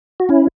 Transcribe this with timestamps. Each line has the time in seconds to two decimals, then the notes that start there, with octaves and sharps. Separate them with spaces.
0.20 F#4
0.29 C#4 E4